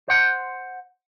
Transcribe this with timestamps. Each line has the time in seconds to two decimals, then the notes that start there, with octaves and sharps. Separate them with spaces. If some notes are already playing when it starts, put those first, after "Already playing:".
0.08 C5 F#5